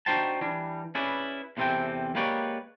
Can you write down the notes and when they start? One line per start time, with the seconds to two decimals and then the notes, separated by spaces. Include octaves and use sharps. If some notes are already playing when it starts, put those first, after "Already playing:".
0.06 D4 D#4 F#4 C5 G5 A5
0.41 E3 G3 D4
0.95 C#4 E4 G#4 B4 D5
1.57 E2 C3 E3 C4 A4 G5
2.15 G#3 A#3 G4 B4 C#5 D5